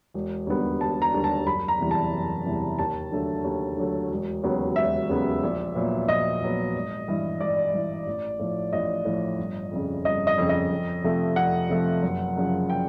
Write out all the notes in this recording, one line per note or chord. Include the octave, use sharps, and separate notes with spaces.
E1
D#2 D3 G3 B3
E1 A5
A#5
D#2 D3 G3 B3
A5
F#1 B5
A#5
E2 C3 E3 G3
A5
F#1
E2 C3 E3 G3
D#2 A5
D3 F#3 A3
D#2
D3 F#3 A3
E1
D#2 C#3 F#3 B3
E1 E5
D#2 C#3 F#3 B3
A#1
A#2 F#3 B3
A#1 D#5
A#2 F#3 B3
G#1
G2 E3
G#1 D5
G2 E3
A1
A2 F3
A1 D#5
A2 F3
G1
F2 C#3
G1 D#5
D#5
F2 C#3
D#5
F2
C3 F3 A3
F2 F#5
C3 F3 A3
F#1
F#2 C#3 F3
G5